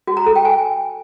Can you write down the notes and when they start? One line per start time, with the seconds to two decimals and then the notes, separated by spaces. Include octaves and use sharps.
0.07 F#4
0.17 A#5
0.26 A4
0.36 G5
0.45 G#5